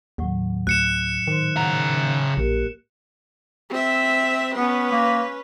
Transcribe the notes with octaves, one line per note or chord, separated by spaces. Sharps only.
D#2 A2 F#3 F#5
D2 F#6 C#7 E7
A#2 D#3 C5 C6
C#3 F#5 A#5
A#1 A#3 G4 A#4
C4 E5
B3 C#4 B4
A#3